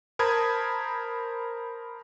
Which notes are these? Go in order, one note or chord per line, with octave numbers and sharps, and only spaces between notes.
A#4 C5 A5 B5 D#6 G#6